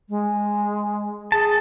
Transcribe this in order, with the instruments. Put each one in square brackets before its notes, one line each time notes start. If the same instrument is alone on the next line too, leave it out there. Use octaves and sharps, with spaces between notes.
[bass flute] G#3
[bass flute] G#4 [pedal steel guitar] A5